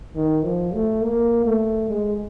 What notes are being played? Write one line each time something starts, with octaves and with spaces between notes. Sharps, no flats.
D#3
F3
A3
A#3
A3
G#3